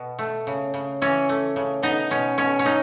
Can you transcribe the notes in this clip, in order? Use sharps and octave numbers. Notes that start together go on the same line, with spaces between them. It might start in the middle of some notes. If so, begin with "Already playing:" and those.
Already playing: B2 B3
A3
C#3
C#3
E3 C#4
A3
C#3
B3 D#4
B2 C#4
B2 C#4
C#4
F#3 D#4